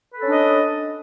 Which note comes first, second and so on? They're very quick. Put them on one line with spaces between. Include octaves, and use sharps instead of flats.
B4 A4 C#4 D4 D#5